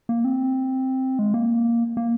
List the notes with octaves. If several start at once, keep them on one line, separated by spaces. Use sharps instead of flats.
A#3
C4
G#3
A#3
A#3